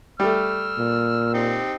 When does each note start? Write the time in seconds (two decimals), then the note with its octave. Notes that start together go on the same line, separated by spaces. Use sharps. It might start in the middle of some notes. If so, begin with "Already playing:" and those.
0.20 G3 A3 E6 F6
0.79 A#2
1.34 C4 D#4 G4